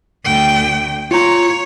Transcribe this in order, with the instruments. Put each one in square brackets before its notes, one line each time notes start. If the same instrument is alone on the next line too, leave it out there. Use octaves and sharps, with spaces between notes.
[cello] D2 G5
[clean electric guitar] F4 A#5 [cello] C#5